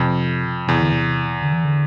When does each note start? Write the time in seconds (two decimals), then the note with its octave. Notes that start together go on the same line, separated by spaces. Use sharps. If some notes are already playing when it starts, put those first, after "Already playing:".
Already playing: F2 C3
0.68 E2 C3
0.81 D3
0.92 C3
1.42 D3
1.53 E3
1.65 D3